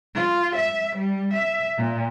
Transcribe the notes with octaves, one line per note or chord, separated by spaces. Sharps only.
F4
E5
G3
E5
A#2